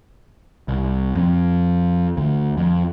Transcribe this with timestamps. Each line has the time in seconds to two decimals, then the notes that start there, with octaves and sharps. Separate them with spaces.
0.68 C2
1.15 F2
2.17 D2
2.57 F2